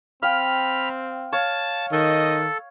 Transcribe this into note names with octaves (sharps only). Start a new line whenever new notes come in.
C4 F5 G5 B5 F6
C#5 F5 A5
D#3 A4 D#5